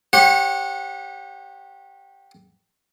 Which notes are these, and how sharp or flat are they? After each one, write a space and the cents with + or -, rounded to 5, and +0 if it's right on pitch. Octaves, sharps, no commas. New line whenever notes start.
G4 +0 C#5 -35 F#5 -20